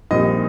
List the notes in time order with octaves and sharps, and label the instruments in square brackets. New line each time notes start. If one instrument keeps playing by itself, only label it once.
[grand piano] A#1 A#2 G3 C4 D#4 D#5